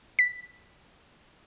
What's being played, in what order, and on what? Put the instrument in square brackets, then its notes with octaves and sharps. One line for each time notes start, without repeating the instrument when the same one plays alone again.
[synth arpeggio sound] B6